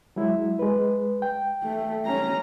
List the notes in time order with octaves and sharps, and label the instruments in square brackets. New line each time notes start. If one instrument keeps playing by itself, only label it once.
[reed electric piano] F#3 G#3 E4
G#3 B4
G5
[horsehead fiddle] A3
C#4 A#5